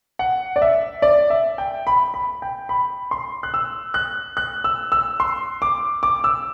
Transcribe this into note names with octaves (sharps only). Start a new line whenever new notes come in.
F#5
D5
E5
D5
E5
G5
B5
B5
G5
B5
C6
F#6
E6
F#6
F#6
E6
E6
C6
D6
D6
E6